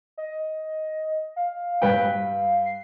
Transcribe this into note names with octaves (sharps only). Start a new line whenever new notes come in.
D#5
F5
G2 B4 G5
C7